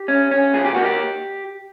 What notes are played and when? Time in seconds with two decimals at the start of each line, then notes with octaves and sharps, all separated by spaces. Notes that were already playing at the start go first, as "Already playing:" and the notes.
Already playing: G4
0.08 C#4
0.31 C#4
0.53 A#2 G#4
0.65 G4
0.75 A#3 F#4
0.85 G4